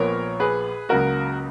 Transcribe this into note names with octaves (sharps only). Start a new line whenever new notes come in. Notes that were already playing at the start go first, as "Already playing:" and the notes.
Already playing: A#1 A#2 F3 B3 A#4 C#5
G#4 B4
C#2 C#3 F#3 A#3 F#4 A#4